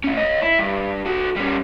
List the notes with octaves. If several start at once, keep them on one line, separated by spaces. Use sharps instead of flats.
A3 C#4
C#5 D#5
E4
G2
F#4 A4
G3 C#4